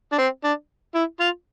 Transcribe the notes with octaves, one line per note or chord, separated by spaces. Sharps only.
D4
C4
D4
E4
F4